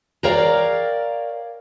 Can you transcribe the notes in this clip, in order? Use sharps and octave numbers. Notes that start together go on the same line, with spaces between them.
A#4 C#5 D5 F5 G5 A#5